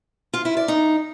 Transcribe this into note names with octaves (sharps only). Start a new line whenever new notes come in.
F4
E4
D5
D#4